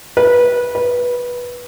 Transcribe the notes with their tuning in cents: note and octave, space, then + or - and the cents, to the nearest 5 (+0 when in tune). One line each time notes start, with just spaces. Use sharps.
B4 -20
B4 -15